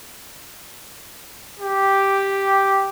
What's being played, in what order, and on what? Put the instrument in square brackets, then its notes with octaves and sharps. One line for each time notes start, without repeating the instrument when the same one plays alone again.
[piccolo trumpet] G4